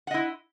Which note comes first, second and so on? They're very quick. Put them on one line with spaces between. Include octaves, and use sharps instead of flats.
F#5 D#5 E4